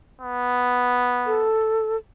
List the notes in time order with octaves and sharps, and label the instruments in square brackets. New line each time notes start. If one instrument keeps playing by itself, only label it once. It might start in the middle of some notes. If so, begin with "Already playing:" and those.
[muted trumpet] B3
[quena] A4